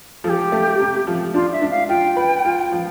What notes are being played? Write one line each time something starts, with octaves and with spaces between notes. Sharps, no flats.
F3 A4
G4
A3
C3
F3
D4 F4
E5
D4
F5
F4 G5
B4
F4
F3